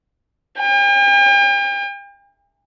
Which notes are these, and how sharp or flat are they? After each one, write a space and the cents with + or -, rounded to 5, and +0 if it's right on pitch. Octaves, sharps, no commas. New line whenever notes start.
G5 +45